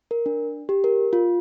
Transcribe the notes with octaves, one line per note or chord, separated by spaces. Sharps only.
A#4
D4
G4
A#4
F4